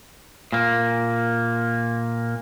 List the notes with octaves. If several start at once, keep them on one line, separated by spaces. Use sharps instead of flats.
A#2 A#3